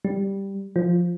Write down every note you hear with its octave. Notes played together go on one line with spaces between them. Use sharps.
G3
F3